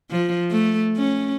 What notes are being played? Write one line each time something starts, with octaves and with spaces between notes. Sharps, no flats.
F3
A3
C#4